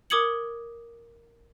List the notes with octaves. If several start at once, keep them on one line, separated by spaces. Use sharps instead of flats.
A#4 D6 D#6 G#6 C#7 F#7